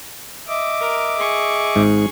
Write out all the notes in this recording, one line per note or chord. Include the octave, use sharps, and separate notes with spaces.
D#5 E5 D6
A#4
G#4 C#6
G#1 G#2